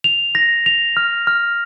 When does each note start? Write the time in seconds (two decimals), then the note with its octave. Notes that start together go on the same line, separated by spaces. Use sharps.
0.04 F7
0.35 A#6
0.66 F7
0.97 F6
1.27 F6